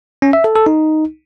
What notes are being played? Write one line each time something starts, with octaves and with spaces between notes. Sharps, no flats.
C#4
E5
A4
A4
D#4